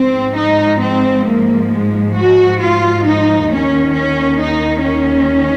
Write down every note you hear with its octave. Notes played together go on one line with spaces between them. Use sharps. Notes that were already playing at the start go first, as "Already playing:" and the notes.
Already playing: G#2 F3 C4
D#4
C4
A#3
G#3
F#4
F4
D#4
D#2 D#3 C#4
C#4
D#4
C#4